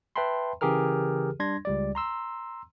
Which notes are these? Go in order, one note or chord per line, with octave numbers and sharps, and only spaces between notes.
B4 E5 G5 A5 B5 C6
C#3 E3 G4 G#4 A#4 F6
G3 D4 C6 G#6 A#6
C#2 G3 D5
A#5 C6 E6